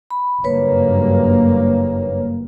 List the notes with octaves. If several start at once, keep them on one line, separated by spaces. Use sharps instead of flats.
B5
F#1 G2 A#3 B4 C#5